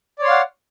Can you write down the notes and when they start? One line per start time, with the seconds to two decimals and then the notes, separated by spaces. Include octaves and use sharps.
0.19 D5
0.22 C#5
0.25 C6
0.28 F5
0.31 F#5